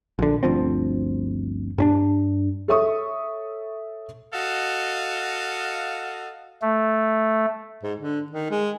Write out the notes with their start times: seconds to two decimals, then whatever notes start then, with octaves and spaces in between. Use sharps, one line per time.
0.19 A#1 D3
0.43 G1 D2 F3 C4
1.78 G2 C#4 D4
2.68 A4 C#5 E5 C#6 D#6
4.33 F#4 A4 D#5 F5
6.62 A3
7.83 G#2
7.99 D3
8.31 D#3
8.51 G#3